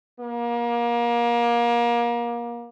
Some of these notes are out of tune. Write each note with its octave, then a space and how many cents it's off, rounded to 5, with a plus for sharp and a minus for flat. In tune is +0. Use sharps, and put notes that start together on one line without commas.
A#3 +30